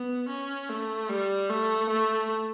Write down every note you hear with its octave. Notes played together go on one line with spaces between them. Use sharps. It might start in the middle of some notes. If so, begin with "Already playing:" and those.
Already playing: B3
C#4
A3
G3
A3
A3